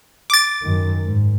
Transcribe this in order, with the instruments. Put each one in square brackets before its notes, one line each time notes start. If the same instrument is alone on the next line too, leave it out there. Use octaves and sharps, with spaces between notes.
[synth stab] D6 A6
[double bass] F#2 D#3
G#2